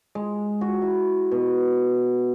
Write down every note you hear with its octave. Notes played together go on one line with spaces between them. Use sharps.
G#3
F#4
E4
B2